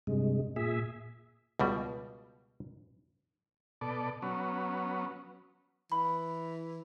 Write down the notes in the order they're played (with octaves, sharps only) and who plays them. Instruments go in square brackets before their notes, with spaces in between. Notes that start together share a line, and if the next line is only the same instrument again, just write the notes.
[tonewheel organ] G2 C3 G#3
A#2 G#4 E5
[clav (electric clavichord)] C#2 B2 G3
[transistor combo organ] B2 A4 D5
F#3 B3 C#4
[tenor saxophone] E3 [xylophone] B5